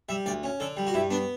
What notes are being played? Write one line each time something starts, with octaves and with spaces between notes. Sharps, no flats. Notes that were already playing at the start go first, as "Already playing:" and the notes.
G3 E5
D2 D5
C#4
D3 A4
G3
F#4
G2 E4
B3 D4